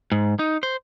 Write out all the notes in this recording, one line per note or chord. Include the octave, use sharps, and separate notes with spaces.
G#2
D#4
C5